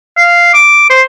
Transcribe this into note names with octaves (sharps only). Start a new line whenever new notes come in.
F5
D6
C5